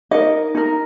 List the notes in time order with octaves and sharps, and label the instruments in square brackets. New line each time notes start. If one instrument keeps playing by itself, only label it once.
[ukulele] D#4 A#4 D#5
D#4 A#4